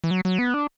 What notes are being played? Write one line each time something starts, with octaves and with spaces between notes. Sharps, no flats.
E3
F#3
F#3
B3
D4